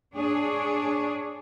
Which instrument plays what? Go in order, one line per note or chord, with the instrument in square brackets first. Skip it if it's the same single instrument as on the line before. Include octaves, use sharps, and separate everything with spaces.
[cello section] D4 G#4 C#5